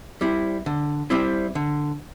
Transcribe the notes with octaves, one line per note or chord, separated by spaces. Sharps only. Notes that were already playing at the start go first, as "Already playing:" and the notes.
G3 C4 E4
D3
G3 C4 E4
D3